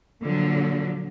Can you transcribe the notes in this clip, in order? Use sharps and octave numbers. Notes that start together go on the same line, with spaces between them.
A#2 D3 F3 F#3